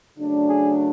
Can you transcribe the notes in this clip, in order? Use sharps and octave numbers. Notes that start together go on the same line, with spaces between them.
C#3 F#3 A3 D4
G#4